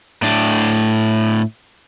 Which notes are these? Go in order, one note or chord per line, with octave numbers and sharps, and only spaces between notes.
A2 D4